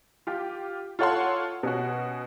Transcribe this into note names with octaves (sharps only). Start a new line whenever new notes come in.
F4 G4
F4 A4 C#5 F#5 A5 C6
B2 C#4 F#4